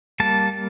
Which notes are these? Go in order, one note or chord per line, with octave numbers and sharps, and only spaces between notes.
G3 A#3 A5